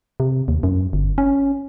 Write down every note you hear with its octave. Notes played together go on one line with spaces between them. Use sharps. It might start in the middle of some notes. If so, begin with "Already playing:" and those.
C3
D#2
F#2
G1
C#4